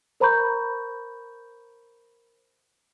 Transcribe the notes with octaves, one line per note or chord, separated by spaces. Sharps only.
A#4 C5 A#5 B5 C#6 G6